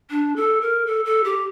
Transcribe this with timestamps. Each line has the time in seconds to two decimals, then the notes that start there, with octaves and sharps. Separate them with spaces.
0.11 D4
0.36 A4
0.61 A#4
0.86 A4
1.05 A4
1.24 G4